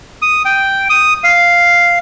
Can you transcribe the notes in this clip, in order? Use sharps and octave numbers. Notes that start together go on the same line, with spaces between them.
D#6
G5
D#6
F5